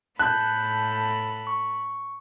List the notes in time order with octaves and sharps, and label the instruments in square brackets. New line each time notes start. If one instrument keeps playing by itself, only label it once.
[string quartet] A2 A4 B5 [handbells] A5 G6 [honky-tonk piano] F#6
[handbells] C#6